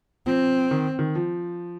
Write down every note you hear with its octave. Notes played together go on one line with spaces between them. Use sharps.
F3 C4
D#3
D#3
F3